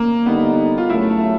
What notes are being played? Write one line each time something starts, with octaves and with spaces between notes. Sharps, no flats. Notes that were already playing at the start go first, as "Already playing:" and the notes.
Already playing: A#3
D3 G3 A#3 B3 D#4
F4
F#2 C#3 F#3 A3 E4